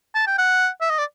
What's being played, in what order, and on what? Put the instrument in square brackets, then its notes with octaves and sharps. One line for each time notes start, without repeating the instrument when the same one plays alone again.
[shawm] A5
G5
F#5
E5
D#5
D5